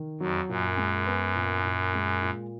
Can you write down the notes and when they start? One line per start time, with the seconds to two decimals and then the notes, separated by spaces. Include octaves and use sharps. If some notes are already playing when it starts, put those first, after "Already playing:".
Already playing: D#3
0.20 F2 F#3
0.49 F#2 A#2
0.77 G#3
1.06 B3
1.35 A#2
1.64 A#2
1.94 G#3
2.22 A#2